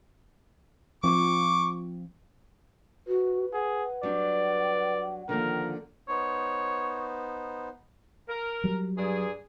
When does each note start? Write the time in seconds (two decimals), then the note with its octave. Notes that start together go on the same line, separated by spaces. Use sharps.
1.04 F3 C4 F4 C#6 D6
3.08 F#4 B4
3.53 G#4 F#5
4.03 F#3 G3 D4 D5
5.29 D3 D#3 F3 A#3 A#4
6.09 B3 D#4 C5 C#5
8.29 A#4
8.64 F#3 G3
8.97 G2 D4 G#4